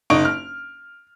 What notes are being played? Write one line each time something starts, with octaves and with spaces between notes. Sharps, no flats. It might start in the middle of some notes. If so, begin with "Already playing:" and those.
F#1 D#4 C#6 D7
F6